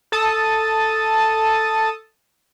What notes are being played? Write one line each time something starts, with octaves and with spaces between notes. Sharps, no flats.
A4 A5 D#6